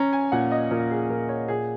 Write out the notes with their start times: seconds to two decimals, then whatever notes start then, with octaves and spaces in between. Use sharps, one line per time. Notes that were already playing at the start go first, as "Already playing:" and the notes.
Already playing: C#4 A#5
0.13 G#5
0.32 A#2 F#5
0.52 D#5
0.71 A#2 A#4
0.91 G#4
1.10 A#2 A#4
1.29 C#5
1.48 A#2 G#4